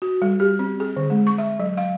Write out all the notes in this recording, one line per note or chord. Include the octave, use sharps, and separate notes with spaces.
F#4
G3
G4
C4
G#4
D3
G#3
C#6
E5
F#3
F5